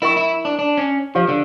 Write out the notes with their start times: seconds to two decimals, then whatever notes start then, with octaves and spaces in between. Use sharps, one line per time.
0.02 E4 A#4 E5 G5 C#6
0.16 E4
0.45 D4
0.59 D4
0.77 C#4
1.15 F3 G4 C#5 F5
1.28 D3